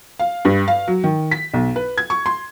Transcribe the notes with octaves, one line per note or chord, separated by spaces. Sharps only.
F5
G2
F5
F#3
D#3
B6
B1
B4
G#6
C#6
C6